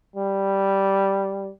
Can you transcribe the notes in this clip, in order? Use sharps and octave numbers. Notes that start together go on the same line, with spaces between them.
G3